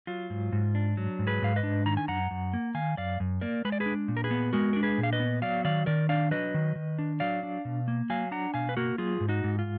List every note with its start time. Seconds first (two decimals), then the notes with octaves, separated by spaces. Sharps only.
0.07 F#3 F4
0.30 G#2
0.52 G#2
0.75 D4
0.97 F#3
1.19 G#2
1.27 G#4 B4
1.42 G#2 F5
1.56 B4 D#5
1.63 D4
1.86 D#3 A#5
1.97 G#5
2.08 F#2 F#5 A#5
2.31 F#2
2.54 A#3
2.75 D#3 F5 G#5
2.97 F#2 D5 F5
3.20 F#2
3.41 A#3 A#4 D5
3.65 G#3 B4
3.72 D5
3.80 G#4 B4
3.86 D4
4.08 A#2
4.17 A#4
4.24 G#4 B4
4.31 B3
4.53 G#3 F#4 A#4
4.73 D4 A#4
4.83 G#4 B4
4.98 A#2
5.03 F5
5.13 B4 D#5
5.20 B3
5.42 F#3 D5 F5
5.65 D#3 D5 F5
5.86 D#3 A#4 D5
6.09 D4 D5 F5
6.31 F#3 B4 D#5
6.54 D#3
6.75 D#3
6.99 D4
7.20 F#3 D5 F5
7.43 D4
7.65 B2
7.88 A#3
8.10 F#3 F5 G#5
8.31 D4 F#5 A#5
8.54 B2 F5 G#5
8.69 B4
8.77 A#3 F#4 A#4
8.98 F#3 F4 G#4
9.20 G#2
9.29 D#4 F#4
9.44 G#2
9.59 F4